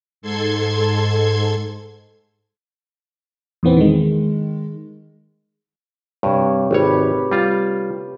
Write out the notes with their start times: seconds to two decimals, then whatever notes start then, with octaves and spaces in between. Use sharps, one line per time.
0.22 G#2 A4 C6 G#6
3.63 E2 A#2 E3 B3 C4
3.77 D#3 G#3
6.23 G2 C3 G4 C#5
6.71 G#1 A3 G4 B4 C#5
7.32 G3 F4